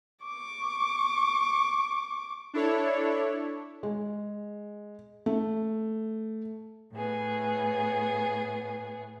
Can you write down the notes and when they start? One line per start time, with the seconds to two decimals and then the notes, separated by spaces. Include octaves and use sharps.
0.25 C#6 D6
2.54 D4 E4 A4 C#5
3.83 G#3
5.26 A3
6.92 A2 B3 G#4